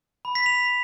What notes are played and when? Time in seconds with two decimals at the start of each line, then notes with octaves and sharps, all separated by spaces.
0.25 B5
0.35 B6
0.46 F7